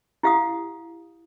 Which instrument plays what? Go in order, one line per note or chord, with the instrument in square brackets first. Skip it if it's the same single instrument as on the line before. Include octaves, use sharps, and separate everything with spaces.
[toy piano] E4 G4 F5 F#5 D#6